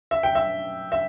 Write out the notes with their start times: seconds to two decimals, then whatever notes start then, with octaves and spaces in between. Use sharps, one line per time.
0.11 E5
0.23 G5
0.35 E5
0.92 E5